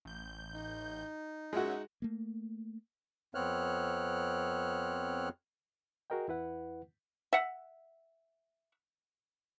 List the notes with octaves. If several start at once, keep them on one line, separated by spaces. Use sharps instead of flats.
A1 G6
D#4
G#3 C#4 F#4 E5 F#5
A3 A#3
F2 B3 C4 C#5 F6 F#6
F#4 G#4 A#4 D#5 G5
E2 E4 B4 F#5
E5 F#5